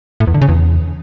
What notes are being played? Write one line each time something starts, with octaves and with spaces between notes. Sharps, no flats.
A2
E2
D3
C#3
E2